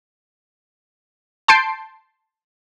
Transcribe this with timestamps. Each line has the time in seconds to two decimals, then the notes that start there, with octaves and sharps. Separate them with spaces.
1.48 A5 C6 G6 C7 D7